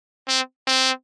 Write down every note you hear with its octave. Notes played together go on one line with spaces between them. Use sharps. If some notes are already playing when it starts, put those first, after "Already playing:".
C4
C4